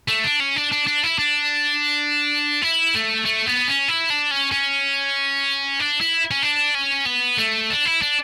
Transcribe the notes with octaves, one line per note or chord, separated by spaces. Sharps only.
A3
D4
C#4
D4
D4
D4
E4
D4
E4
A3
A3
B3
C#4
E4
D4
C#4
C#4
D4
E4
C#4
D4
C#4
B3
A3
D4
E4
D4